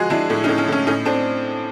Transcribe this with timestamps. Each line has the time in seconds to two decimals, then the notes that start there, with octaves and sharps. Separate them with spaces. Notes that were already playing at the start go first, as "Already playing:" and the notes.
Already playing: F3 G#3 F#4 G#4
0.10 G#3 D4 E4
0.30 A2
0.44 C#4 D#4
0.49 A2
0.58 C#4
0.68 A2 C#4
0.87 A2 C#4 D#4
1.05 A2 C4 D4